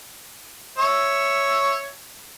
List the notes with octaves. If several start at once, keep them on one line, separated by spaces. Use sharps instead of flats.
C#5 E5